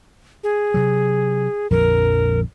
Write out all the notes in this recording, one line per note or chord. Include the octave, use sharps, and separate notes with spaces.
G#4
C3 F#3
A#1 F2 D3 A#4